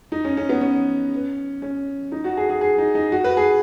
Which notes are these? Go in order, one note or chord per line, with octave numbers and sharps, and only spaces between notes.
D#4
C#4
C#4
B3
C#4
C#4
D#4
F#4
G#4
G#4
G#4
D#4
D#4
F#4
B4
G#4